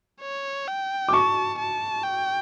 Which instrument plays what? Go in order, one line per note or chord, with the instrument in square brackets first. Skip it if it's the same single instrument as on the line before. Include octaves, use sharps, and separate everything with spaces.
[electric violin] C#5
G5
[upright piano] D6
[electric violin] A5 [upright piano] C#6
[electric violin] A5
G5